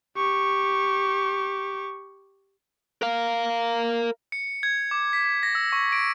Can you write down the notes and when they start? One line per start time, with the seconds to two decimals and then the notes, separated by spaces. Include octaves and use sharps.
0.17 G4 C#6
3.02 A#4 F5
4.32 C#7
4.63 G#6
4.91 D6
5.13 B6
5.25 B6
5.43 A#6
5.55 E6
5.72 C#6
5.92 D7